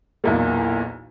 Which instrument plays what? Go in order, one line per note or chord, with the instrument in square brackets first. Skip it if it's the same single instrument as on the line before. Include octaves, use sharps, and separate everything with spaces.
[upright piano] B1 E2 A#2